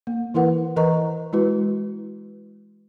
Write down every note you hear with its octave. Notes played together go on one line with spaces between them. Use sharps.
A#3
E3 E4 A#4 B4 F#5
E3 A#4 B4 D#5 A#5 C#6
G#3 E4 F#4 B4